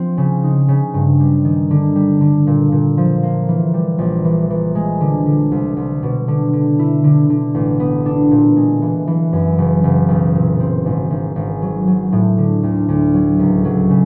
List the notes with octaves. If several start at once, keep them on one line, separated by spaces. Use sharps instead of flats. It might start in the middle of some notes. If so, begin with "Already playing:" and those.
Already playing: F3 C4
C#3
D#4
C#3
G2
G3
D#3
D3
G3
D3
A#2
A#2
F3
A#3
E3
G3
A#1
E3
E3
G#3
D3
D3
C2
C2
B2
D3
D3
E4
D3
D3
A1
B3
D4
A#2
G#3
E3
E3
F#2
F#1
F#1
B1
A#2
C4
G#1
G#1
G#1
F#3
F#3
A2
D3
D2
D2
F#3
C#2
F#3
C#3